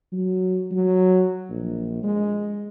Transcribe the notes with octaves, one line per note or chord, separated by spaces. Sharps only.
F#3
F#3
A#1
G#3